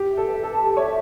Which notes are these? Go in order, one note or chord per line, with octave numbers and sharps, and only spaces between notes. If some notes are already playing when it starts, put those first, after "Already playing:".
Already playing: G4
E5
A4
B4
A4 A5
G4
C#5 E5